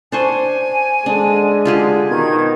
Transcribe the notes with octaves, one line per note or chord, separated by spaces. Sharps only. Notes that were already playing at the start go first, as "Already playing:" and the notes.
D4 C5 G#5 C#6
D3 G#3 D4
F4 G4 G#4
B2 D#3 G#6